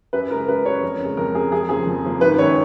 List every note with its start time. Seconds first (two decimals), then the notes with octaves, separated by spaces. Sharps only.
0.13 F#2 B4
0.30 C#3 A#4
0.33 G#3
0.48 F#2 B4
0.65 C#3 C#5
0.69 G#3
0.82 F2 A#4
1.00 C#3 G#3
1.17 F2 A#4
1.34 C#3 G#3 G#4
1.52 F2 G#4
1.69 C#3 F3 A#3 G#4
1.87 F2
2.04 C#3 F3 A#3
2.21 G#1 B4
2.38 F#2 D#3 C#5